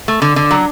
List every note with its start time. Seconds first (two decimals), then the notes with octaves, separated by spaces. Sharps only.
0.08 A3
0.22 D3
0.36 D3
0.51 F#3